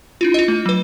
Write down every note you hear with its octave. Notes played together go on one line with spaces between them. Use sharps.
D4 E4 F4
F4 D#5
A3
F#3 B4